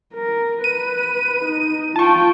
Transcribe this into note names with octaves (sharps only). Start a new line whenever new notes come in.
A#4
B4 D#7
D#4
F4 G5 A5 C#6